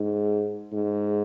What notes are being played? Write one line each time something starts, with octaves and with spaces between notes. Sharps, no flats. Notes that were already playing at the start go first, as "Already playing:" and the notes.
Already playing: G#2
G#2